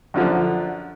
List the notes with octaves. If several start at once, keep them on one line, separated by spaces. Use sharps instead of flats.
F#2 D3 F3